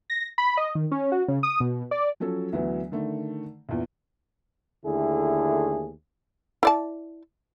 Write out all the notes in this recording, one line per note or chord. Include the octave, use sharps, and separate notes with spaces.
A#6
B5
D#5
D#3
C#4
F#4
C#3
D#6
B2
D5
F3 F#3 C#4 A4
D2 E3 F#3 B3
D3 D#3 A3
A#1 E2
D#2 D3 A3 E4 G#4
E4 D5 A5